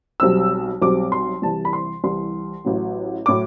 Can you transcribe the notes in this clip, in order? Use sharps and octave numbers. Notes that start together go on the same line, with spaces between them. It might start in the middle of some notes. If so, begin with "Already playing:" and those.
B1 B2 G3 C4 E6
B1 B2 G3 C4 D6
C6
C2 C3 E3 A5
B5
C6
C2 C3 E3 C6
A1 A2 F#3
A2 F#3 D6